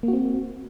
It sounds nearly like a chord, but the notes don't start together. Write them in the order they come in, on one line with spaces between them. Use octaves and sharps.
A#3 F#4 C4